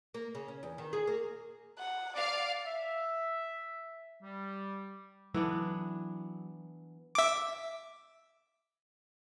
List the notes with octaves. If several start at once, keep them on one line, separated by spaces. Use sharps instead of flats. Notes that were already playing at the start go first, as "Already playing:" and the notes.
A#3
C#3
C#4
E2
D#3
G#4
A#3
F#5
D5 F5
E5
G3
E3 F#3 B3 D4
E5 D6